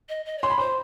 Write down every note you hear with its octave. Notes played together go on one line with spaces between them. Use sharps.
D#5
D#5
D5
C#5 C6
B5
C5 C6